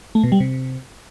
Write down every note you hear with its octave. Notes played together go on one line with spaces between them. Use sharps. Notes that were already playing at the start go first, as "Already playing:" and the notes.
A3
B2
G3
C3